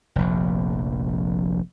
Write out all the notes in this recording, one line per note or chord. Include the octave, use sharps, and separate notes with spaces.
F1 A#1